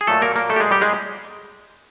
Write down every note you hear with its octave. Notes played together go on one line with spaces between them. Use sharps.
G#4
A#2 F#3 A3 A4
A#3 A#4
A#3 A#4
A3 A4
G4
G#3 G#4
G3 G4
G#3 G#4